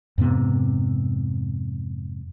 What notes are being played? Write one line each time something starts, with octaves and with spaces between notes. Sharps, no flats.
F2 G#2 C3 B3